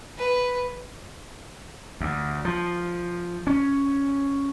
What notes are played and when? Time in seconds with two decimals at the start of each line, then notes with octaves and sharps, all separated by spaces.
0.18 B4
2.01 D2
2.45 F3
3.47 C#4